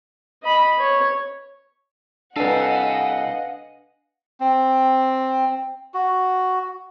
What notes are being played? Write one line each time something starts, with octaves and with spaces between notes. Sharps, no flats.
D#5 B5
C#5
C2 D4 A4 B4 D#5 F5 F#5 G#5
C4
F#4